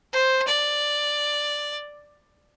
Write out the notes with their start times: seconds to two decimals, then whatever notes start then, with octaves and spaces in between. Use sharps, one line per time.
0.13 C5
0.48 D5